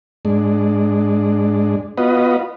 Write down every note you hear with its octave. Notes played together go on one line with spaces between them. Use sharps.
G#2 G#3 D4
B3 F4 F#4 B4 D#5